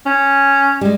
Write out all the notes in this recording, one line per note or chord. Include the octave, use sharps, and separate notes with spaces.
C#4
G3 G#3